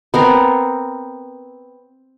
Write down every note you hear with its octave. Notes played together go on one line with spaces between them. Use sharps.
B3 C4 A#4